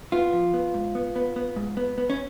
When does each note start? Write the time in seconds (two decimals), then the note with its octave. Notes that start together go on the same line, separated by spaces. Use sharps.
0.12 B3 F4
0.33 F3
0.54 B3
0.74 G#2
0.95 B3
1.16 B3
1.36 B3
1.56 G#2
1.77 B3
1.98 B3
2.10 C#4